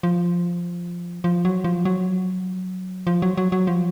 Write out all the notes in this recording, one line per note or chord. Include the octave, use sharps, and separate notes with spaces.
F3
F3
F#3
F3
F#3
F3
F#3
F#3
F#3
F3